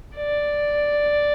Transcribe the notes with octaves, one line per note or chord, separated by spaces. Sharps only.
D5